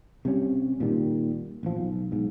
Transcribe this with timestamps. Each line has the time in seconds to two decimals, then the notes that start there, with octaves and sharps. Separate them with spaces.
0.25 C3 G3 C#4
0.80 A#2 D#3 G3
1.63 A1 F3
1.77 B1
2.11 B1 G#2